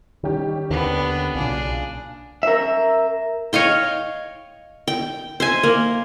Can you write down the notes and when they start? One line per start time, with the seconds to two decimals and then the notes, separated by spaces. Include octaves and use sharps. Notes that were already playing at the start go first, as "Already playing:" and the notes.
0.24 D#3 G3 C#4 G4
0.70 D#2 D3 B3 D4
1.35 B1 A#2 C#3 D4 G#4
2.43 A#4 E5
3.53 C#5 D#5 F5 G5
4.88 G5
5.40 C5 E5 G#5
5.63 A#3